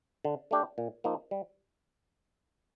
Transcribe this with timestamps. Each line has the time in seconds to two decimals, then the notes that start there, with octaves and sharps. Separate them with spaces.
0.25 D3
0.51 A3 D4 G4
0.78 A#2
1.04 F3 A#3 D#4
1.31 G3